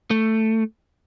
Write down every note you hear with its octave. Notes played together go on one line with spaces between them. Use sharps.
A3